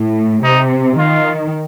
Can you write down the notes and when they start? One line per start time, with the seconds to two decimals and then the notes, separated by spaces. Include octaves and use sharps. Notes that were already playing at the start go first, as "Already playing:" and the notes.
Already playing: A2
0.43 C3 D#4
0.98 D#3 F4